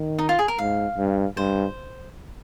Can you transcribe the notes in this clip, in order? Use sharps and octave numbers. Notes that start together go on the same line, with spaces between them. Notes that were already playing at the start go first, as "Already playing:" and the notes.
Already playing: D#3
D#4
F4
G#4
A#4
G#2 F5
G2
G2 C5